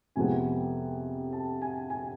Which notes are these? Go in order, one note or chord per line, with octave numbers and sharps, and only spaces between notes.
F2 C3 F3 G#3 B3 G#5
A5
G#5
G#5